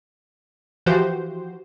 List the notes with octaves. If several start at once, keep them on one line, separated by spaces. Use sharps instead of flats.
E3 F3 F#4 G4 C5